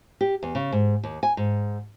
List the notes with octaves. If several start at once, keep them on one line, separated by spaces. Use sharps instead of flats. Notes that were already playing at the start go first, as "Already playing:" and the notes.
G4
E2
C#3
G#2
D#2
G#5
G#2